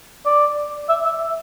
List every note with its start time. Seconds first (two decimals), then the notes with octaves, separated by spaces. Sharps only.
0.26 D5
0.89 E5
1.05 E5